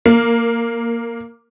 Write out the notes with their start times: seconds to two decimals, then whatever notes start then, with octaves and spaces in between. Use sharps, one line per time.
0.06 A#3